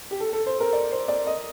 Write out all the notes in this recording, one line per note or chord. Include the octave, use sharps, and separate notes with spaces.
G4
A4
A4
C5
A#4
D5
C5
D5
D#5